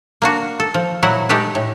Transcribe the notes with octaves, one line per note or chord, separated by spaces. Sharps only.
A#3 D4 F#4
A4
F3
A#2 F#3 E4 F#5
G#3 A3 G4 A4 B4
A2